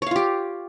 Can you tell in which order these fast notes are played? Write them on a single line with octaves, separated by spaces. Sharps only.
C#5 F5 F4 G4